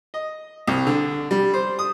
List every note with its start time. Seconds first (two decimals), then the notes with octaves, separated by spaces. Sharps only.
0.14 D#5
0.68 C2
0.87 D3
1.31 G3
1.54 C5
1.79 D#6